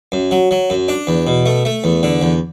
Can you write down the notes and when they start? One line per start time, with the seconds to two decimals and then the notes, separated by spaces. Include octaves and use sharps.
0.12 F#2
0.31 F#3
0.51 F#3
0.70 F#2
0.88 D4
1.07 E2
1.27 B2
1.46 A3
1.65 A3
1.84 E2
2.03 D3
2.22 E2